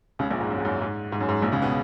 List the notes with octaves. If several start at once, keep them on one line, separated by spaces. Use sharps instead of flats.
C#2 C#3
A#1 A#2
G#2
F#2
G#2
F#2
G#2
G#2
F#2
G#2
A#1 A#2
C#2 C#3
B2 B3